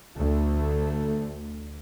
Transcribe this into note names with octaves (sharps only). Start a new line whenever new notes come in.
D2 A3